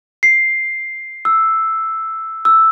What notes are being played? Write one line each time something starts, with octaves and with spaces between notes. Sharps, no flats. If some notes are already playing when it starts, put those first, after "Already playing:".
C7
E6
E6